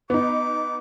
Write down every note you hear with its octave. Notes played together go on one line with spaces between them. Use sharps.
B3 D#4 D6